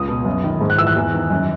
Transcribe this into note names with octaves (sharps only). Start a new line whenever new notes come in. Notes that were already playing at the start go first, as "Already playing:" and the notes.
Already playing: C#2 D#6
B2
F#2
D#3
G#2
F#6
E3 E6
F#6
E2
D#3
F#2